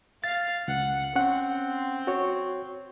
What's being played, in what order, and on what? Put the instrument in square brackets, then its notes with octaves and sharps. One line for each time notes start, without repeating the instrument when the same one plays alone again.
[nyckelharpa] F5 [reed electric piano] A6
[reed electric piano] C#2 [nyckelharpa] F#5
[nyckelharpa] C4 [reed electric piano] C#4 F#5
[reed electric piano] F#4 C#5